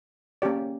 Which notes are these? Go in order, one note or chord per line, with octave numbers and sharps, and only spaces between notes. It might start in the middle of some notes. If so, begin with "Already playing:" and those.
A#3 C#4 G4 D5